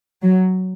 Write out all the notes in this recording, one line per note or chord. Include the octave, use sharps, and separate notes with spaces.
F#3